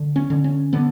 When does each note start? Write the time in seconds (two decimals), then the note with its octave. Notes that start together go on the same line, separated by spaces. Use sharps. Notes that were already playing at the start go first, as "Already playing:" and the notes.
Already playing: D3
0.16 C#4
0.30 D3
0.44 C#4
0.73 D3 B3